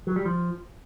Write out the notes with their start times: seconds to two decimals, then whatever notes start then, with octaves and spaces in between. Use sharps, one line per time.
0.07 F#3
0.16 G3
0.26 F3